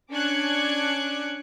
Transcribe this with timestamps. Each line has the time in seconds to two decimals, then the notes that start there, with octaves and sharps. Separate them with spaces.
0.10 C#4 D4 D6 F#6 G#6 C#7